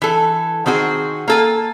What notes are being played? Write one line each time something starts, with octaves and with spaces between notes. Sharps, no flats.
E3 A4
D#3 C4 F#4 G#4
A#3 A4 G#5